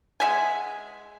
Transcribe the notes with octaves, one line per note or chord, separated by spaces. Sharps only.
G#3 E5 F#5 G#5